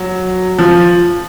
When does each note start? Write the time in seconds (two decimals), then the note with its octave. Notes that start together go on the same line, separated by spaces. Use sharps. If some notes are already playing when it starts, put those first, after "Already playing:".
Already playing: F#3
0.59 F3